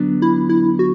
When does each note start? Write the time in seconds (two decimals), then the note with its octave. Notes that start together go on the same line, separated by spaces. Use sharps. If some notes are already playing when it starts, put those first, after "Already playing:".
Already playing: D3 F#3 B3 D4
0.22 E4
0.49 E4
0.79 F#4